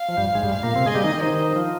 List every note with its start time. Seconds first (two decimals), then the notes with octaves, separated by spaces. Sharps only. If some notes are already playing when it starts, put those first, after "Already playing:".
Already playing: F5
0.09 F3
0.17 G2 G3
0.35 G#2 G#3
0.43 G2 G3
0.52 F5
0.63 A#2 A#3
0.75 C3 C4
0.86 G#3 G#4 D#5
0.95 G3 G4
1.04 D#3 D#4
1.21 D#3 D#4 C5
1.56 F3